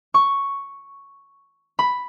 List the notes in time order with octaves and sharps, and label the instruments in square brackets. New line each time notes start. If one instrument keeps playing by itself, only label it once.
[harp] C#6
B5